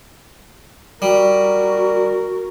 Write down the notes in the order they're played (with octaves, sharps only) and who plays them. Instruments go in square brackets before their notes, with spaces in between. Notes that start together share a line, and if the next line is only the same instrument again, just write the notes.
[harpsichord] G3 [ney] F#4 [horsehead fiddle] A#4